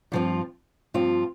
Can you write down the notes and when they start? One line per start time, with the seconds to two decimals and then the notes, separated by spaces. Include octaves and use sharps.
0.12 G2 F3 C4 F4
0.94 G2 F3 C4 F4